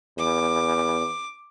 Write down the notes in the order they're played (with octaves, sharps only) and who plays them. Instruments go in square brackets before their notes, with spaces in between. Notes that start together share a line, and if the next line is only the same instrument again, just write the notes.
[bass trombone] E2 [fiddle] D6